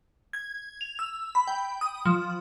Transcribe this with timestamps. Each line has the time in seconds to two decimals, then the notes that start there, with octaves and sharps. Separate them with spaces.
0.33 G#6
0.81 F7
0.99 E6
1.35 B5
1.48 G5
1.81 D#6
2.05 F3